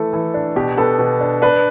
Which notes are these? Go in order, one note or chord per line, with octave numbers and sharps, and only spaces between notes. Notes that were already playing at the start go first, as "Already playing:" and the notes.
Already playing: E3 A3 A4
E3
D4
B2 G4
B3 A4
B2
D4
D4 B4